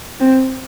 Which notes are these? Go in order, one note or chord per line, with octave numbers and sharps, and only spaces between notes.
C4